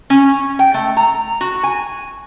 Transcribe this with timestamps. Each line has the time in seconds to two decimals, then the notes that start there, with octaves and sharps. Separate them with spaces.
0.10 C#4
0.59 G5
0.74 A3
0.97 A#5
1.41 F#4
1.63 G#5